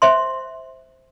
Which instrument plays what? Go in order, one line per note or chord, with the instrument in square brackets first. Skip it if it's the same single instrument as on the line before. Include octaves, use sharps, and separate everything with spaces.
[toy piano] C5 E5 C6